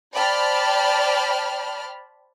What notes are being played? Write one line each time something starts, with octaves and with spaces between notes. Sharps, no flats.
C5 D5 G5 A5 B5 F6